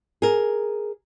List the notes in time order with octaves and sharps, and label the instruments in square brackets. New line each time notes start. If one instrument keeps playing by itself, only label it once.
[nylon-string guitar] G#4 A#4